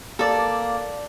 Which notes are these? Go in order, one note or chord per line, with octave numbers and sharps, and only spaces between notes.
A#3 A4 D5